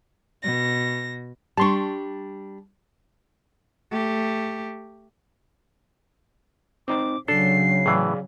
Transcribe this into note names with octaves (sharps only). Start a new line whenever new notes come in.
B2 A#6
G3 D4 A5 C6 C#6
A3 G4
C4 D#4 C5 D6
C#3 F#3 D4 A4 C7
A2 E3 G#4 D5 F5